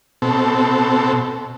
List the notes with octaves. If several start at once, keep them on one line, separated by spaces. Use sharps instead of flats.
B2 C4 A4